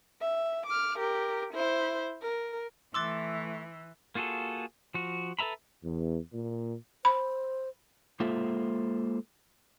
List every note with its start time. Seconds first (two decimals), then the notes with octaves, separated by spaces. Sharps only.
0.21 E5
0.67 D6 F6
0.99 G4 A#4
1.54 E4 C5
2.22 A#4
2.94 E3 A3 C6 D6 E6 F#6 A6
4.15 A#3 F4 F#4 G#4 A4
4.94 F3 F#4
5.39 A4 B4 E5 A#5 B5
5.84 E2
6.33 A#2
7.05 C5 B5
8.20 G#3 A#3 F4 A4 C5 E5